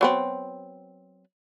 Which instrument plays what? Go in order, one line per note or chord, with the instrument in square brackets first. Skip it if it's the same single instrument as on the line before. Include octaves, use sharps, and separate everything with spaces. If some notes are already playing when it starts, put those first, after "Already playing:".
[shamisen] F#3 B3 C4